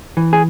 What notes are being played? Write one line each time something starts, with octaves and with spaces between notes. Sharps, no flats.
E3
G#4